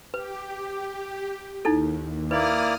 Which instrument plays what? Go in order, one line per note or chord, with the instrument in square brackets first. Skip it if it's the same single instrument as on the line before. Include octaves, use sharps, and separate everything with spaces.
[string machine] G4 [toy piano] B4
[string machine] D#2 [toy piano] D#4 E4 A4
[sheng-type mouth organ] A#3 E4 D5 [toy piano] B4 [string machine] D#6 F6